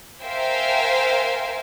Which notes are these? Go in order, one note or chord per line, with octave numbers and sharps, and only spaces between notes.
A#4 C5 E5 F5 G5 G#5